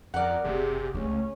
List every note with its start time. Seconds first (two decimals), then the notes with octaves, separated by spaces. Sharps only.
0.14 F2 A#4 D5 F#5
0.45 F#1 C3 G4 G#4
0.95 C#2 A3 C#4